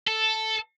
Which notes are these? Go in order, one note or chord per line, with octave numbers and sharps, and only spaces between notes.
A4